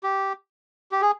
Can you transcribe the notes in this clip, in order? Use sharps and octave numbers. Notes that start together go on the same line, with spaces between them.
G4
G4
G#4